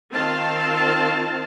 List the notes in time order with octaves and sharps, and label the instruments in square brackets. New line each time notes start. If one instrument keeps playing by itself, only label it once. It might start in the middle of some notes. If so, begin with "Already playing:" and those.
[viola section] D#3 C4 F4 F5 A5